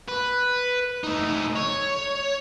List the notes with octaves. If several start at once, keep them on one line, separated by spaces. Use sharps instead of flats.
B4
A3 D#4
C#5